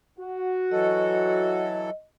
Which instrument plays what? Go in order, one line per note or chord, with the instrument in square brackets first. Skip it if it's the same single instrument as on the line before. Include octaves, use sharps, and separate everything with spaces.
[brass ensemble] F#4
[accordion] E3 F#3 A4 [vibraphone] D#5